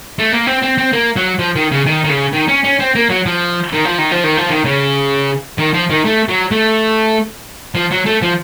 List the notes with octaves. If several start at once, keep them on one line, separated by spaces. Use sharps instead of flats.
A3
A#3
C4
C4
C4
A#3
F#3
F3
D#3
C#3
D#3
D#3
C#3
D#3
C#4
C#4
C4
A#3
F#3
F3
D#3
F3
D#3
F3
D#3
F3
D#3
C#3
D#3
F3
D#3
A3
F#3
A3
F3
F#3
A3
F3